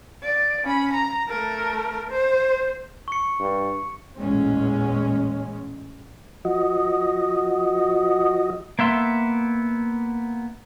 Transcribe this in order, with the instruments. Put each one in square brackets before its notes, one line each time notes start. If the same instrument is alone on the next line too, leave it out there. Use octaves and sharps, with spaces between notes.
[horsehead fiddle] D5
C#4 B5
A#5
A3 A#4
C5
[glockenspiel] C#6 C#7
[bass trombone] G2
[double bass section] A1 E2 A#2 G#3 C#4
[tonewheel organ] F3 F#4 D#5
[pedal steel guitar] A#3 B3 E5 C6